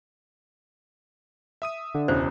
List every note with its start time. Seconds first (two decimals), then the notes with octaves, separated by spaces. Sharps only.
1.62 E5 D#6 D#7
1.94 D3
2.08 E1 C#2 E4 C5